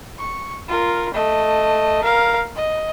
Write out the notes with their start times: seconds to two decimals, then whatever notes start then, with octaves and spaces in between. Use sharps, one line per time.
0.19 C#6
0.69 F4 A#4
1.13 A3 D#5
2.03 A#4 F5
2.56 D#5